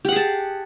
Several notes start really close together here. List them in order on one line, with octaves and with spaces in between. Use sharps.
G4 F#5 G#4 A5